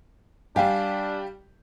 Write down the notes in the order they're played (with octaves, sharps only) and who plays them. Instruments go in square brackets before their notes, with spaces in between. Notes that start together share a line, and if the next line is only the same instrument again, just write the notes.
[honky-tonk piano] G3 G4 [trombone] D4 [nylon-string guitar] F5 G#5